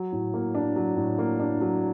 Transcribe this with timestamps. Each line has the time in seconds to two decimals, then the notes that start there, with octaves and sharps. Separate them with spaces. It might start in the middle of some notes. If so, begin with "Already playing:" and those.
Already playing: F#3
0.12 A2
0.34 A#3
0.55 D4
0.76 F#3
0.97 A2
1.19 A#3
1.40 D4
1.61 F#3